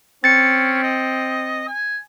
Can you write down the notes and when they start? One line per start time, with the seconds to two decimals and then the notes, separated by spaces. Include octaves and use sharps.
0.24 C4 C#4 A6 C#7
0.83 D#5
1.68 G#5